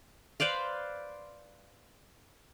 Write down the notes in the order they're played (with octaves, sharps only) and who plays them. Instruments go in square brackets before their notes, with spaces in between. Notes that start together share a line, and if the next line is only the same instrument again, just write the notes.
[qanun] B4 C5 D5 F5